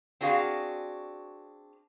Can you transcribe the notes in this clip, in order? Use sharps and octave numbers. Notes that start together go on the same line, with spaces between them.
C4 D4 F#4 G#4 F5